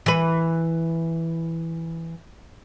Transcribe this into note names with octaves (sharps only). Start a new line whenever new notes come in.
E3 B4